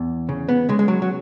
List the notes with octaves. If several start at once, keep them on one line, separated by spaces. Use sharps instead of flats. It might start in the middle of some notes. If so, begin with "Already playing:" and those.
Already playing: E2
C#3
B3
C#3 G#3
G#3
F#3
F#3